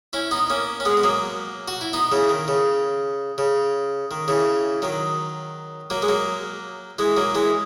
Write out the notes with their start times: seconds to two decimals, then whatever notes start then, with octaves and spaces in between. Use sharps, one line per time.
0.13 C#4 E4
0.31 B3 D#4
0.50 A#3 C#4
0.80 C#4
0.85 G#3 B3
0.97 B3
1.04 F#3 A#3
1.68 F#4
1.81 E4
1.93 B3 D#4
2.12 C#3 E3
2.29 D#3
2.48 C#3
3.38 C#3
4.11 D#3
4.28 C#3 E3
4.82 D#3 F#3
5.90 F#3 A#3
6.02 G#3
6.08 F#3 A#3
6.99 E3 G#3
7.17 F#3 A#3
7.35 E3 G#3